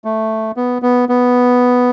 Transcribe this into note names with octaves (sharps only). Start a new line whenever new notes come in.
A3
B3
B3
B3